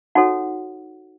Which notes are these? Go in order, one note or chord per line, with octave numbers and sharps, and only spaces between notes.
D#4 F#4 A4 C#5 F#5